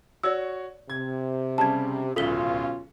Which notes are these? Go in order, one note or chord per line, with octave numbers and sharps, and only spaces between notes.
F#4 C#5 D5 E6
C3 G#6
C#3 G3 A5 G#6
D1 C#2 B2 C#4 F4 A4 B6 G7